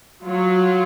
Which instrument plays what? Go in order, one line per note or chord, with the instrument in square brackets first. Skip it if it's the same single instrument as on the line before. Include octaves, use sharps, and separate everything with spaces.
[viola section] F#3 [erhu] F4